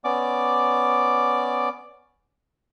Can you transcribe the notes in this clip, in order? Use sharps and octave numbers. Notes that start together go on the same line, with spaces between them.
B3 C#4 D5 D6